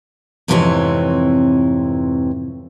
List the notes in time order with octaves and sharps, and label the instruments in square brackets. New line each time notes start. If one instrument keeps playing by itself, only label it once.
[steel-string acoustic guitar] F2 G#2 C3 E3 C4 C#5